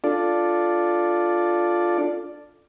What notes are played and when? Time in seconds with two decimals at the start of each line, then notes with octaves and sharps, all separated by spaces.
0.04 D4 F4 A4 D5